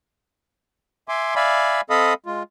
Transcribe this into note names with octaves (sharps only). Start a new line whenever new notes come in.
E5 G#5 C6 D6
D5 E5 F5 G#5 B5
C4 A4 D#5 F5 B5 D#6
G#3 F4